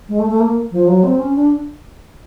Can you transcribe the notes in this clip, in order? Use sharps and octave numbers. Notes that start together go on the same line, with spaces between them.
G#3
A3
A3
A#3
F3
F#3
C4
C#4
D4